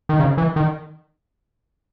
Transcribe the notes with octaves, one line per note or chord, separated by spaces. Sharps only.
D#3
C#3
E3
D#3